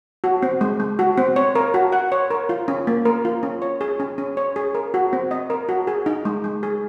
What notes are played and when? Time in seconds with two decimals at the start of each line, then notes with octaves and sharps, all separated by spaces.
0.24 F#4
0.43 C4
0.61 G#3
0.80 G#3
0.99 F#4
1.18 C4
1.36 C#5
1.55 A#4
1.74 F#4
1.92 F#5
2.12 C#5
2.30 A#4
2.49 F4
2.68 C#4
2.87 A#3
3.05 A#4
3.25 F4
3.43 C#4
3.62 C#5
3.81 G#4
4.00 C#4
4.18 C#4
4.37 C#5
4.56 G#4
4.75 A#4
4.94 F#4
5.13 C4
5.31 D#5
5.50 A#4
5.69 F#4
5.87 G#4
6.06 D#4
6.25 G#3
6.44 G#3
6.63 G#4